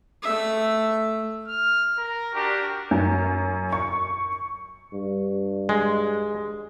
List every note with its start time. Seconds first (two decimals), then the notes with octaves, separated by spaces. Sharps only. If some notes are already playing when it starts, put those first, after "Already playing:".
0.22 A3 E5
1.48 F6
1.98 A#4
2.35 D4 F#4 G4 A#4
2.91 F#2
3.73 C#6
4.93 G2
5.69 G#3